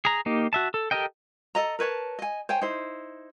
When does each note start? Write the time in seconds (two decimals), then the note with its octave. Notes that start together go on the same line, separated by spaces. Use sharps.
0.05 G#4 A#5
0.26 A#3 D#4 G4
0.53 F#4 E5 A5
0.74 A4
0.91 G4 A4 A#4 D#5 G5
1.55 A4 D#5 A#5
1.79 A#4 B4 C#5 A5
2.19 D#5 G#5
2.49 C5 C#5 G5 G#5
2.61 D#4 E4 C5